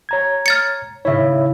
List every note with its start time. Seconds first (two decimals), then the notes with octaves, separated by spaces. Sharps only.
0.09 C#5 A#5 G#6
0.46 F6 A6 C#7
1.05 A2 C#3 E4 C#5 E5